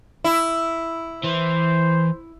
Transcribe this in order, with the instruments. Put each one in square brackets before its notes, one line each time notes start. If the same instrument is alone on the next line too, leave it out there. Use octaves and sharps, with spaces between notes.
[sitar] E4
[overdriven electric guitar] E3 [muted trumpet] C5